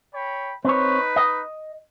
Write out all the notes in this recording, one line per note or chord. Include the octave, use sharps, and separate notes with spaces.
C#5 G5 B5
C4 D#4 B4 C#5
D#5